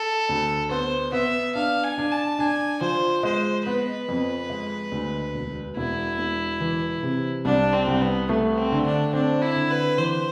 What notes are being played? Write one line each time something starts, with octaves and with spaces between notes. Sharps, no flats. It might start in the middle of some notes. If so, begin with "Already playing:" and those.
Already playing: A4
D2
B3 C5
B3 E5
D4 F5
G#5
D4
A5
D4 G#5
F3 C5
G#3 C5
B3 B4
F2
G#3
D2
E1
E1 E4
E1
E3
C3
C2 D4
C4
C2
B3
A3 B3
C4
D3
D4
C4 D4
E4
D3
B4
E3 C5